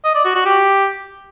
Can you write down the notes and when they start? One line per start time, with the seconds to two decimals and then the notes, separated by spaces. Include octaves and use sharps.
0.04 D#5
0.15 D5
0.25 F#4
0.35 F#4
0.45 G4